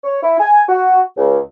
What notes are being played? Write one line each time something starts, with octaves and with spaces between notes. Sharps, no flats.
C#5
E4
G#5
F#4
C#2